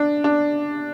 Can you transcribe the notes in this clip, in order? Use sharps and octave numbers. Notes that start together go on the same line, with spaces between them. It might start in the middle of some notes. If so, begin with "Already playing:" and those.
Already playing: D4
D4